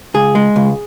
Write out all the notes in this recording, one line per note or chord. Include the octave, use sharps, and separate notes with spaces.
C#2 G#4
G#3
C#2